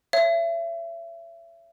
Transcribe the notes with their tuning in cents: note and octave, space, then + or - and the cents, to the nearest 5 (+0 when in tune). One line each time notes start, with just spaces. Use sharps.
C#5 +5 E5 +30